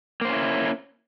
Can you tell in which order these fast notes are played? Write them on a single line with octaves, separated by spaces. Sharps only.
A#3 C5 C#4 E4